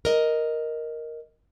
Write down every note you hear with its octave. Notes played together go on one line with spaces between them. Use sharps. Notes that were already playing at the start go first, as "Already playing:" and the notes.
A#4 D#5